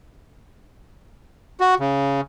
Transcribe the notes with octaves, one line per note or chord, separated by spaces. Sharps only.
F#4
C#3